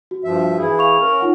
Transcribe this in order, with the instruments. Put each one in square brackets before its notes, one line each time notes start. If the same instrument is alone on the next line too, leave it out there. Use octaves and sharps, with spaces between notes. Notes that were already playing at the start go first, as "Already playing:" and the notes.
[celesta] F#4
[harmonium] G2 F3 E5
E3 E4 G#4
[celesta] F5 C#6 F7
[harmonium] C#4 A#4
[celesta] D#4 F4 F#5